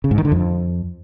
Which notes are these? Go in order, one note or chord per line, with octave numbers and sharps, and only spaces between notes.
C#3
G#2
D#3
D3
F2